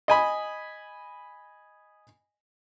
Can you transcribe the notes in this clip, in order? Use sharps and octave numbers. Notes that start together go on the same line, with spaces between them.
D#5 G#5 B5